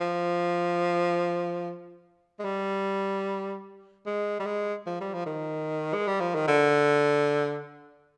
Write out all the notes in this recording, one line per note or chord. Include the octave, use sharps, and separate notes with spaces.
F3
G#3
G3
G#3
G3
G#3
F3
G3
F3
D#3
G#3
G3
F3
D#3
D3